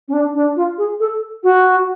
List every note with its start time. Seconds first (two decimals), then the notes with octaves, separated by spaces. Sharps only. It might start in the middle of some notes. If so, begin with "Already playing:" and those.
0.08 C#4
0.13 D4
0.35 D4
0.56 F4
0.78 G#4
1.00 A4
1.43 F#4